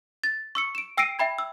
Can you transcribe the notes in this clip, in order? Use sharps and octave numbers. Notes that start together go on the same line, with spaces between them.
A6
C#6 E6 C#7
D7 E7
G5 E6 A#6 C7 D7 D#7
E5 G5 B5 G#6
E6